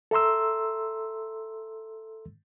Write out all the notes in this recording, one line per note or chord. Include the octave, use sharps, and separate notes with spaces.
A4 E5 A#5 C6 E6